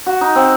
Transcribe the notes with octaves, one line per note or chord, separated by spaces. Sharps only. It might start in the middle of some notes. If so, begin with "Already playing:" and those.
F#4
D#4
C4